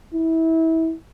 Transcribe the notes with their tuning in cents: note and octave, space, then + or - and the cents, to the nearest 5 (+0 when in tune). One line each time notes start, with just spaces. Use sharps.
E4 -25